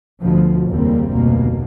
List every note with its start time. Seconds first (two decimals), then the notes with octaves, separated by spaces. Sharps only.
0.20 D2 B2 F3
0.69 F1 D#2 C#3 G3 A#3 C4
1.12 F1 D2 B2 A#3